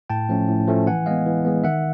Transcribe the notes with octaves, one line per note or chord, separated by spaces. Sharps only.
A2 G5 A5
F3 A3 C#4
A2
F3 A3 C#4
E3 F#5 G#5
G#3 B3 D#5 F5
E3
G#3 B3
D#3 E5 F#5